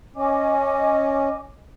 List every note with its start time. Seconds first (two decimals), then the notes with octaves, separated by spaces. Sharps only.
0.16 C#4 D#5 G#5 D6